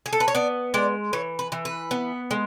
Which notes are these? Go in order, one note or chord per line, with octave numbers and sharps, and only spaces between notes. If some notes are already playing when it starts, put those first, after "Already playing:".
G#4
A4
B4
C#5
B3 D5
G#3 D5
E3 C#5
B4
E3
B4
B3
G#3